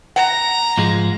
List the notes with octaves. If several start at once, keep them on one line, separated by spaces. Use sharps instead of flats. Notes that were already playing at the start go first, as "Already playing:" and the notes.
F#5 A#5
G#2 F3 G#3